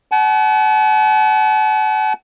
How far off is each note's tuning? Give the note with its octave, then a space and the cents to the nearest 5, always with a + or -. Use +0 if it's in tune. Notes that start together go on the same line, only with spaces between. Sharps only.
F#5 +35 A5 -40